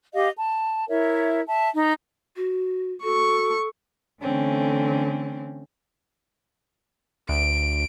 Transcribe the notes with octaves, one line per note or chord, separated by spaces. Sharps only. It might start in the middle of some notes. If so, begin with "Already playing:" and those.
G4 D#5 F5
A5
E4 A#4 C#5 E5
E5 A5
D#4
F#4
F#4 A4 C#6
D3 E3 A3 C4 C#4
D2 D7